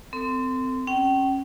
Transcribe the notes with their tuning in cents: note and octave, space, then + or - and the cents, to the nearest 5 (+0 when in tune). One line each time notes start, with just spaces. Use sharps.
C4 -20 A4 +35
C#4 -25 G5 -35